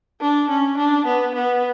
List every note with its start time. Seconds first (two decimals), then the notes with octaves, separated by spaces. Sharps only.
0.21 D4
0.50 C#4
0.77 D4
1.06 B3
1.35 B3